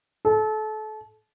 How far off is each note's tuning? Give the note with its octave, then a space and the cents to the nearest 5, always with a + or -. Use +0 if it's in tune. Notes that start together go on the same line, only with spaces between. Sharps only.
A4 -30